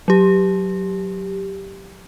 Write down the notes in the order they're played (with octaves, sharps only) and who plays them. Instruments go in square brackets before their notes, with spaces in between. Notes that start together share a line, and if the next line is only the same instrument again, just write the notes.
[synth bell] F#3 G4